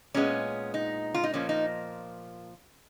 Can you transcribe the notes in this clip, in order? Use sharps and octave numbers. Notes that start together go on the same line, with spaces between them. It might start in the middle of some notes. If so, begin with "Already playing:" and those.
A#2 G#3 B3 C#4
D#4
F4
D#4
A#2 F3 A#3 C#4
D#4